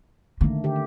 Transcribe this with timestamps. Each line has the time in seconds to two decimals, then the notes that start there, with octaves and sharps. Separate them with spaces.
0.41 D3 D#3 A3 A#3
0.64 D3 G4